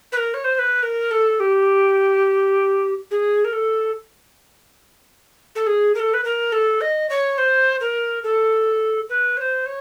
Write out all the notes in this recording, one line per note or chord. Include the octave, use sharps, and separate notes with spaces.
B4
A#4
C#5
C5
C5
B4
A#4
A4
G4
G#4
A#4
A4
A4
G#4
A#4
A4
B4
A#4
A4
D#5
C#5
C5
A#4
A4
B4
C#5
C5
C#5